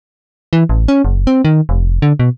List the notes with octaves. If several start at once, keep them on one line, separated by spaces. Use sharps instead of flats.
E3
A1
C#4
F#1
C4
D#3
F1
D3
B2